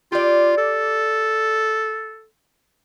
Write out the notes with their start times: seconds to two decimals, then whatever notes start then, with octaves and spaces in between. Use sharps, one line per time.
0.12 F4 G4 D5
0.57 A4